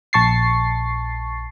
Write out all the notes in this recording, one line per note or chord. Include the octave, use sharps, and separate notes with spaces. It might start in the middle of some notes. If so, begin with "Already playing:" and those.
A#1 A5 C#6 A6 C7